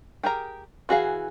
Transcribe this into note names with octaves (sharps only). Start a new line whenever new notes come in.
G4 G#4 A#4 A#5
E3 F#4 G#4 F5